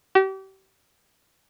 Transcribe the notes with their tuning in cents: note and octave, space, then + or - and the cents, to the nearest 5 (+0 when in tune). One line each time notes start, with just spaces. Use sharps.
G4 -35